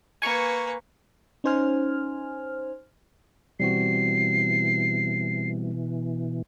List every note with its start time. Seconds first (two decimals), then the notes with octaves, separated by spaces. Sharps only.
0.22 A#3 B4 G#5 C#6
1.44 C#4 D#4 C5 G#5 F6
3.60 B2 E3 G3 C4 F#4 C7